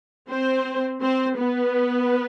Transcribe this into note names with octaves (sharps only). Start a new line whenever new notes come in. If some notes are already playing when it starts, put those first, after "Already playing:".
C4 C5
C4 C5
B3 B4